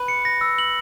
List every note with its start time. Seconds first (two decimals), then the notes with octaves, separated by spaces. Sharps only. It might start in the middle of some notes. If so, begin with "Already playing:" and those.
Already playing: B4
0.08 C#7
0.25 A#6
0.41 E6
0.58 F#7